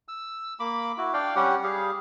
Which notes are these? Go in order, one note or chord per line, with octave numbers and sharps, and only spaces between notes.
E6
A#3 B5 D6
E4 F#4
D4 D5 F5 G5
G3 C#4 G4 F#5
G3 G4 G#4 F5